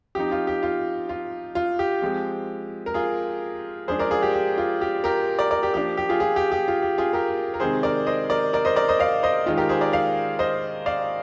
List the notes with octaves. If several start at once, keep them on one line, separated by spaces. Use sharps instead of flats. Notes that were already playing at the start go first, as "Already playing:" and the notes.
F3 C4 D#4 G4
F4
G4
F4
F4
F4
G4
F3 G#3 C4
A#4
F4 G#4
F3 G#3 D4 G#4 C5
A#4 D5
F4 G#4
G4
G4
F4
G4
G4 A#4
A#4 D5
A#4 D5
G4
F3 A#3 D4 G4
G4
F4 G#4
F4 G#4
G4
G4
F4
G4
F4 G#4
G4 A#4
A#4
C3 D#3 G#3 C4 D#4 G#4 C5
A#4 D5
C5 D#5
A#4 D5
A#4 D5
C5 D#5
A#4 D5
C5 D#5
D5 F5
C5 D#5
D#3 G#3 D#4 F4
G4 A#4
G#4 C5
A#4 D5
D5 F5
C5 D#5
D5 F5